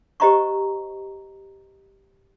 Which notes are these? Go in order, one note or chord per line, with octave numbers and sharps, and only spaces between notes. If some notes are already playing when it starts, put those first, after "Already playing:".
G4 C5 D#5 A#5 B5 C#6